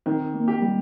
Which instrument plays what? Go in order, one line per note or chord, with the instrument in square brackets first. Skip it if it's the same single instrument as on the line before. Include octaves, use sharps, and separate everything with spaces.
[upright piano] D#3 [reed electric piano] C4
[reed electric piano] A#3
[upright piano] G4
[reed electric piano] G3